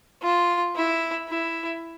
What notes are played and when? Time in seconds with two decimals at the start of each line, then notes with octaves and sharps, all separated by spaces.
0.22 F4
0.76 E4
1.29 E4